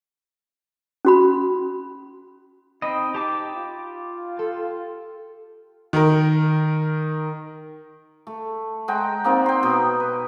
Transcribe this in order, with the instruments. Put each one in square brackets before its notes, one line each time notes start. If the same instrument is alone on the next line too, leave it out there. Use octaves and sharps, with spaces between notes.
[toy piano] C#4 F#4 B5
[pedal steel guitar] C4 D#5 [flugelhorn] D#4 [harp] B5
[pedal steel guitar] G4 A5 D6
[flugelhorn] F4
[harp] A4 A6
[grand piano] D#3 A#4
[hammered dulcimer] A3
G#3 F#5 G5 A#5
A#3 C4 D#4 D5
G5 C6
B2 D#5
B4